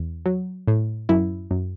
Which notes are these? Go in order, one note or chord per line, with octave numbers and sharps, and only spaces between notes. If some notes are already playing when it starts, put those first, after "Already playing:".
Already playing: E2
F#3
A2
F#2 E4
F#2